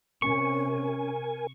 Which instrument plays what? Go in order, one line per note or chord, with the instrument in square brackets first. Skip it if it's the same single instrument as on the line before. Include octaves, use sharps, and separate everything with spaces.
[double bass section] C3 [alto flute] C#4 [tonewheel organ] A#4 G#5 [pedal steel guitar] C#6